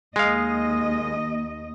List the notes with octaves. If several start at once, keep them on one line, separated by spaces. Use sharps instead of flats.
D#2 G#3 D#5 F5